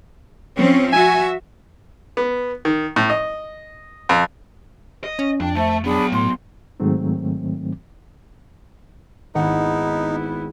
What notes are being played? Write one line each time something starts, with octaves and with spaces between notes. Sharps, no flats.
F3 C4 C#4
F#4 E5 G#5
B3
D#3
A2
D#5
F2
D#5
C#4
F2 D4 G5
A3 C5 E5 A5
F#3 B3 D4 G#4 B5
A2 C6
G#2 D#3 F#3 A3 C4
G#1 B3 D#4 E4 F#5